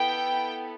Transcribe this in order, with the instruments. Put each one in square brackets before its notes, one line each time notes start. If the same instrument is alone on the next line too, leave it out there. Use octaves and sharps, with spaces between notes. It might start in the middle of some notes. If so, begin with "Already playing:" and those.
Already playing: [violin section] B3 E4 A4 G5